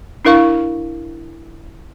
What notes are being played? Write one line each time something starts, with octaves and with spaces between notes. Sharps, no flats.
D4 E4 A#4 F5 C#6